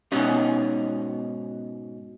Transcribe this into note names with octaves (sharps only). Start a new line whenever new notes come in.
G#2 B2 B3 C#4 D#4